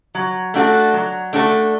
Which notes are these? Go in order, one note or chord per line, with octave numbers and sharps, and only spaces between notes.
F#3
A3 D4 F#4 A4
F#3
A3 D4 F#4 A4